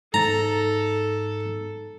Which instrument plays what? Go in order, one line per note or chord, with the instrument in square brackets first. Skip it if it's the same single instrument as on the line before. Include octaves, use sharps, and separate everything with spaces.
[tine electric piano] G#2 A6 [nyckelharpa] A4 [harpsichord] A#5